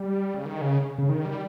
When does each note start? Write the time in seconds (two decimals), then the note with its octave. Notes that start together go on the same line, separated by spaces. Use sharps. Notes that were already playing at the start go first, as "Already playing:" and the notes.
Already playing: G3
0.34 C#3
0.46 D#3
0.61 C#3
0.98 C#3
1.09 D#3
1.25 G3